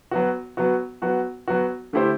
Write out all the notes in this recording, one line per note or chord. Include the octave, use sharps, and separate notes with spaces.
F#3 B3 F#4
F#3 B3 F#4
F#3 B3 F#4
F#3 B3 F#4
D3 A3 E4 G4 C5